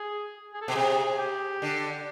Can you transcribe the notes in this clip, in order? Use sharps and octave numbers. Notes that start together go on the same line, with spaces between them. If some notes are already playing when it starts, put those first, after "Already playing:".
Already playing: G#4
G#4
A4
B2 G#4
C3
G4
D3